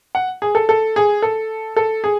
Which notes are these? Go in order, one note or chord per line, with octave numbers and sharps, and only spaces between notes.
F#5
G#4
A4
A4
G#4
A4
A4
G#4